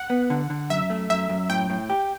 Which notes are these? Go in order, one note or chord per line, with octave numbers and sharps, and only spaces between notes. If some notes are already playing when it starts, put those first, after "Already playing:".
Already playing: F#5
B3
D3
D3
F#2 E5
A3
F#2 E5
F#2
A2 G5
A2
G4